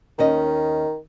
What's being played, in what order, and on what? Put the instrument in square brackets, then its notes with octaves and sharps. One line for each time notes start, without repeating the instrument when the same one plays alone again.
[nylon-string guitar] D#2 C#4 D#5 [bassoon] D#3